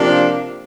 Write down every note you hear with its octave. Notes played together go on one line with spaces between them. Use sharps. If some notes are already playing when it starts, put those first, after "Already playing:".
Already playing: C3 F3 A#3 D4